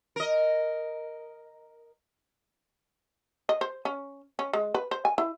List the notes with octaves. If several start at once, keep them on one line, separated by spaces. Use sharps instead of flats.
A#4 D#5
D#5
C5
C#4
C#4
G#3
B4
C5
G#5
E4